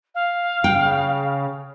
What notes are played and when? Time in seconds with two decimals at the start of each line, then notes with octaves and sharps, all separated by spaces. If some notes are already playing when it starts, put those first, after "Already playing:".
0.15 F5
0.64 C#3 G5